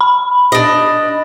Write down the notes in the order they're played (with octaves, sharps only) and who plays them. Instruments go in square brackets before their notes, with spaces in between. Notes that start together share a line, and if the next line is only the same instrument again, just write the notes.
[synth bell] B5
[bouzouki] D4 D#5